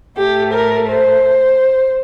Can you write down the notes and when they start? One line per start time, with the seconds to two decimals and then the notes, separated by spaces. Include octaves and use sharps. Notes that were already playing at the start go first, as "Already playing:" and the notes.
0.17 A2 A3 G4
0.53 A#4
0.90 C5